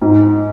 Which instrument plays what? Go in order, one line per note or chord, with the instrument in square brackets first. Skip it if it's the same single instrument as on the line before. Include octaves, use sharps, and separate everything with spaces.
[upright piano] G#2